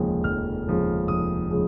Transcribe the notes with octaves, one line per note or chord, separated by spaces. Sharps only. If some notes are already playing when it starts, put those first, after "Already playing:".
Already playing: F1 D#2 C#3 F3 G#3
F1 F6
D#2 C#3 F3 G#3
F1 D#6
C#3 F3 G#3